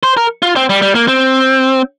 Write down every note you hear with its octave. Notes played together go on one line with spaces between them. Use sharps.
C5
A#4
F4
C4
G3
G3
A#3
C4